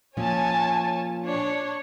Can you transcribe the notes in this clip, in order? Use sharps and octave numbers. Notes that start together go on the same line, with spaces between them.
A#2 F3 C#4 C#5 G#5 A5
D4 C#5